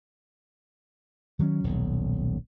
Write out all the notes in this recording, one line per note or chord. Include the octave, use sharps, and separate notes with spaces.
D#3 F#3 G3 C#4
D#1 B1